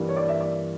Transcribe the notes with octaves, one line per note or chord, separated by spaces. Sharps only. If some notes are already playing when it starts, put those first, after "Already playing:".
Already playing: G2 E3 G3 A#3
C#5
D5
E5
D5